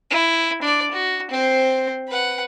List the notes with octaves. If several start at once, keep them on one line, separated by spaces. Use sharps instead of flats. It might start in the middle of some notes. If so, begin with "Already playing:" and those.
E4
D4 D5
F#4
C4 C5
B4 F#5